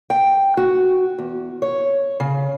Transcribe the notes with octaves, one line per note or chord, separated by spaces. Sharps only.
G5
F#4
E2
C#5
C#3